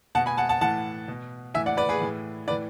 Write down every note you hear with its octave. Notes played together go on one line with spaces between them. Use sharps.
B2 F#5 A5
G#5 B5
F#5 A5
F#5 A5
A2 E3 F#5 A5
B2
A2 E3 E5 G#5
D5 F#5
B4 D5
G#4 B4
A2 E3
A2 E3 B4 D5